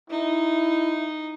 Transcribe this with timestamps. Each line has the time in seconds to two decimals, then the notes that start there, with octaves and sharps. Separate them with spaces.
0.10 D#4 E4